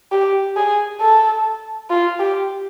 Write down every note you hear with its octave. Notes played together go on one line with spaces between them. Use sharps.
G4
G#4
A4
F4
G4